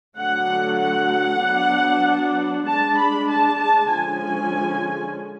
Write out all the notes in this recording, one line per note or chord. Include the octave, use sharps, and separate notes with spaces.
D3 F#3 A3 F#5
F#5
F#3 B3 D4
G#3 D4 A5
B5
A5
D3 F3 G#3 C#4 G#5